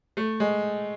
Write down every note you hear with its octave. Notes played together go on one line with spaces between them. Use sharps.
A3
G#3